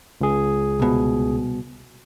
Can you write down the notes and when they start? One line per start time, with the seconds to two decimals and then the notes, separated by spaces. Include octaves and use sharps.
0.21 C#2 G#4
0.80 C2 B2